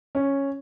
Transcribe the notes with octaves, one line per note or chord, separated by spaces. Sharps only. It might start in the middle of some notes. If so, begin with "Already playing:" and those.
C#4